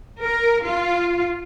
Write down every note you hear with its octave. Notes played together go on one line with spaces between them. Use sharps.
A#4
F4